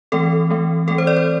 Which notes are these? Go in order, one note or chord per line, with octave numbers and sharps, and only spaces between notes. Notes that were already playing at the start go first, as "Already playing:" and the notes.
E3 A3 C4 A4
E3 A3 C4
E3 A3 C4 A4
C5
D5
C5